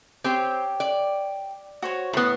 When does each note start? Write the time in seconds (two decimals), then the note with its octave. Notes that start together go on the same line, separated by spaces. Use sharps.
0.24 C4 G4 C#5
0.80 D5
1.82 F#4 C5 C#5
2.13 A2 B3 B5 D#6